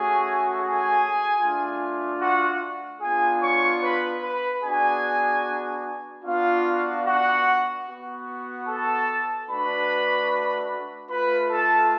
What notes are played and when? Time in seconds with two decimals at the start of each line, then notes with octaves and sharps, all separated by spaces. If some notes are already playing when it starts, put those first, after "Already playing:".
Already playing: A3 C#4 F#4 G#4 G#5
0.57 G#4 G#5
1.39 A3 D4 F4
2.20 F#4 F#5
3.00 B3 D4 F4 G#4 G#5
3.41 C#5 C#6
3.81 B4 B5
4.22 B4 B5
4.62 B3 D4 F#4 G#4 G#5
6.24 B3 D4 F4 F#4 F5
7.05 F#4 F#5
7.86 B3 F#4
8.67 A4 A5
9.48 A3 D4 F#4 B4 B5
11.09 A3 F4 B4 B5
11.50 A4 A5